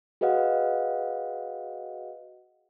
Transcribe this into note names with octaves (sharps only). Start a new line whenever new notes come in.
F#4 G#4 B4 D#5 F5 F#5